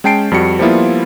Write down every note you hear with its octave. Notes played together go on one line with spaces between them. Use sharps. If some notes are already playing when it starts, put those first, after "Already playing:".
G#3 C#4 G5 A5 C7 D7
F2 G3 F#4 C#7
F3 G3 A#3 B3 E4 F4